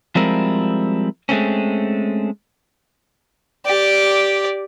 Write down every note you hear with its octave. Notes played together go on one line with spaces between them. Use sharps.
F3 G3 G#3 C4 E4 A#4
G#3 A3 C4 C#4
G4 D5